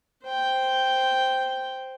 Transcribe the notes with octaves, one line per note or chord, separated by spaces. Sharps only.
C5 G5